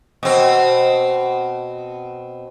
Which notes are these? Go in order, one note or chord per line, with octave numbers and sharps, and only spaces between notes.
B2 C4